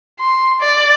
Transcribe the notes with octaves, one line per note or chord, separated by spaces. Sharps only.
C6
D5